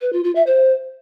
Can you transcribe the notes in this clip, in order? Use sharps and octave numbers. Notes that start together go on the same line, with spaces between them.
B4
F4
F4
E5
C5